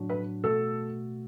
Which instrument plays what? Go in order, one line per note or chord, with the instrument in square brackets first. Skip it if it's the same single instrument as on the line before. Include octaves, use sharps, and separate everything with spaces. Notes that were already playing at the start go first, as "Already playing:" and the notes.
Already playing: [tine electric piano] A2 F#3 D4 F#4
[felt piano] B4
[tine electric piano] B2 A3 F#4 [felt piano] A4